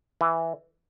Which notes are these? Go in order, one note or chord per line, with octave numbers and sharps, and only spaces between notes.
E3